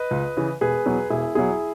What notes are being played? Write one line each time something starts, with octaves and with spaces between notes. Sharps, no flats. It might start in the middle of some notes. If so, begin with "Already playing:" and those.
Already playing: B4 D#5
C#2
C#3 E3
E1 G#4 B4
E2 B2 F#3
E1 E4 G#4
E2 B2 F#3 E4 G#4